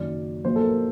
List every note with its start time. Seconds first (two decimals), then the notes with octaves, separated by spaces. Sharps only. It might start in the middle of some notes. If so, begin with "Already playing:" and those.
Already playing: F#1 F#2 D#3 F#3 D5
0.44 A#1 A#2 F#3 C5
0.56 A4
0.64 A#4